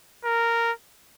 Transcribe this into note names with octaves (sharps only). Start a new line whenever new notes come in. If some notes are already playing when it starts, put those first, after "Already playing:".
A#4